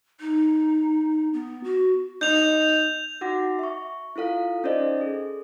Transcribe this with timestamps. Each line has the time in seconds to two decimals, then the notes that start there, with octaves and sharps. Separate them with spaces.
0.21 D#4
1.34 B3
1.64 F#4
2.21 D#4 G6 F7
3.21 D#4 F#4 F#5 D6 A#6
3.59 E5 C#6
4.16 E4 F4 A4 F5
4.64 C#4 D#4 A4 C5 D5 D#5
4.98 G#4 A4